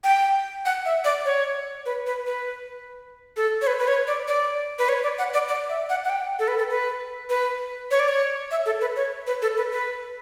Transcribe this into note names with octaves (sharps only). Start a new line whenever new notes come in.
G5
F#5
E5
D5
C#5
B4
B4
B4
A4
C#5
B4
B4
C#5
D5
D5
B4
C#5
D5
F#5
D5
D5
E5
F#5
F#5
G5
A4
B4
A4
B4
B4
C#5
D5
C#5
E5
A4
B4
C#5
B4
A4
B4
B4